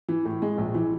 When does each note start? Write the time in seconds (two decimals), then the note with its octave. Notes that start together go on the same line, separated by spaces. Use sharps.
0.09 E3
0.25 A2
0.42 G#3
0.58 A#1
0.74 E3